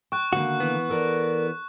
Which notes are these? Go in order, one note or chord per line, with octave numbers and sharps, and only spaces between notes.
G5 C#6 F#6
D3 D#3 A#3 F#4
E3 B3
A4 A#4 D5